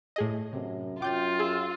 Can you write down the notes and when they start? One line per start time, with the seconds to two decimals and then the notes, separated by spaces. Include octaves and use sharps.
0.16 A2 G#4 D#5
0.53 F#2 C3
1.02 F#2 F4 G5 D6 G6 A6
1.39 G#4 E6